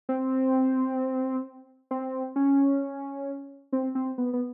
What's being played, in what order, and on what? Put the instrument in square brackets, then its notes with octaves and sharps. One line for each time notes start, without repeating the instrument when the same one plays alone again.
[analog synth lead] C4
C4
C#4
C4
C4
B3
B3